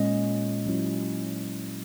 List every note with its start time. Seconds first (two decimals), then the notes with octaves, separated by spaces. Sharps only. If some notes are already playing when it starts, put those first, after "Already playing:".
Already playing: A#2 G#3 C#4 D#5
0.66 F#3 C#4 E4